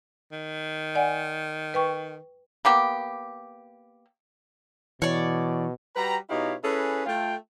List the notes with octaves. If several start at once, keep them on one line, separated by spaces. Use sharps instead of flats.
D#3
D5 F#5 G#5
B4 G5 C#6
A#3 B3 G4
B2 E3 C#5 D5
G3 F#4 B4 G5 A#5
B2 D#4 E4 G4 C#5 F5
C#4 E4 G#4 A4 B4
A3 F4 G5